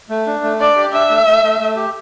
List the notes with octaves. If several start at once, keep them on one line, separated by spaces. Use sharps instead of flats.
A3
D4
A3
D4 D5
G4
D4 E5
A3
A3
A3
A3
G4